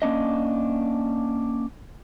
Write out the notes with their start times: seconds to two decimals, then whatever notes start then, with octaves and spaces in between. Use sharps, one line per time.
0.02 A#3 C#4 D4 D#5